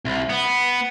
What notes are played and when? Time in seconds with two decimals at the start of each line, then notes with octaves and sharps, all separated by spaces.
0.05 C2
0.30 B3